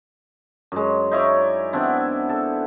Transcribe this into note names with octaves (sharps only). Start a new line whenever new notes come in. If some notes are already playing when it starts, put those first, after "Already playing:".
F#2 G#3
D#4 E4 C#5 D5
B3 C4 D4 E4
A4